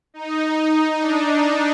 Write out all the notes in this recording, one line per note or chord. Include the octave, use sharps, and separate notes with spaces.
D#4
D#4
D4
D4